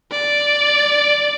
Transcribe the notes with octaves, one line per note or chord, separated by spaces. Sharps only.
D5